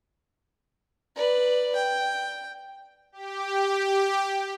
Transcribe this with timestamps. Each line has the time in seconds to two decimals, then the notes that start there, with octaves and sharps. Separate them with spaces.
1.16 B4 D5
1.75 G5
3.12 G4